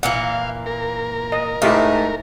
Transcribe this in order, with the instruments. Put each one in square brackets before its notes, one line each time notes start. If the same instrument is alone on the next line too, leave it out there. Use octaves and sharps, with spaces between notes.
[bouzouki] A#2 E3 A#3 [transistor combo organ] F5 [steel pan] F#5
[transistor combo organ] A#4
[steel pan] D#5
[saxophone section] G#2 A3 [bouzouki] D#4 [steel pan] E4 G4 F5